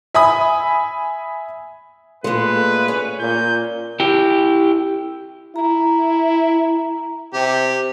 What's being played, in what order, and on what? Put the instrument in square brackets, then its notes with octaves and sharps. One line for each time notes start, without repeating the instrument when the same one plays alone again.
[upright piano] E5 G#5 B5 D#6
[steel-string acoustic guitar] A#2 G#3 [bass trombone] A3 [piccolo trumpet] B4
[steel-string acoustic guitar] C#4
[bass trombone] A#2 [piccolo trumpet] G6
[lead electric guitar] E4 G4
[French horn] E4 [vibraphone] A#5
[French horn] C3 [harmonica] G4